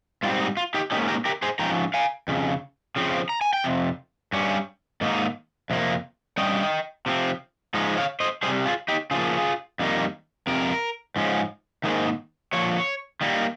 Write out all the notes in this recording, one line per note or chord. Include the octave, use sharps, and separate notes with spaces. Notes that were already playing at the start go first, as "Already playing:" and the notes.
G#2 G3 C4 F4
D#4
F4
D#4 G4
G#2 D#3 A#3 C#4 D#4 G4
G4 A#4
G4 A#4
G#4 C5
G#2 F3 C#4 G5 A#5
F5 G#5
F2 C#3
C#3 F3 C4
A#5
G#5
G5
F2 C3
G2 G3 C#4
G#2 D#3 A#3 D#4
F2 C3 A#3
G2 G3 C#4 D#5 G5
C3 F3 C4
G#2 F3 G#3 D#4
C#5 F5
C5 D#5
C3 D#3 G3 G#4 C5
F4 G#4
D#4 G4
C#3 F3 A#3 F4 G#4
F2 D#3 G3 A#3 D#4
F2 C3 A#4
G#2 F3 G#3 C#4
G#2 D#3 A#3 D#4 G#4 C5
A#2 F3 C#5
D#3 G3 A#3